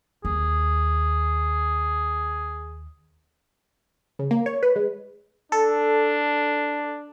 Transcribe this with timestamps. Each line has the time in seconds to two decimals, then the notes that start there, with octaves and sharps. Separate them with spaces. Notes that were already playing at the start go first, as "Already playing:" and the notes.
0.25 D#2 G#4
4.19 C#3
4.31 A#3
4.46 C#5
4.63 B4
4.76 G#3
5.52 D4 A4